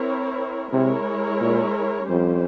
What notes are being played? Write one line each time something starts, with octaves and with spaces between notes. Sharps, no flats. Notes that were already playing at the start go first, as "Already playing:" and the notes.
Already playing: C4 E4 A#4 C#5
C3 G#3 E4 A#4 C#5
A#2
F2 G3 C#4 G4 C5